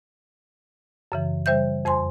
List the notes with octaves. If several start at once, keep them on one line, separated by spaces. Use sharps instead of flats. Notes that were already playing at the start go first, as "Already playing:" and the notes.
F#2 C#3 E3
C#3 G3 C5 E5 G6
F2 C5 G#5 C6